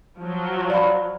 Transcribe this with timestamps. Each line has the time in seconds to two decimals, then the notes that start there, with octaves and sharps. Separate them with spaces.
0.19 F3 F#3
0.70 D5 F5 B5